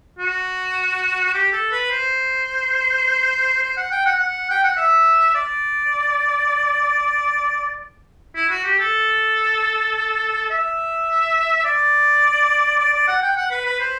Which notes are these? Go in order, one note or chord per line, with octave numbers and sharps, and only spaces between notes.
F#4
G4
A4
B4
C5
C5
F#5
G5
F#5
F#5
G5
F#5
E5
D5
E4
F#4
G4
A4
E5
D5
D5
D5
F#5
G5
F#5
B4
B4
C5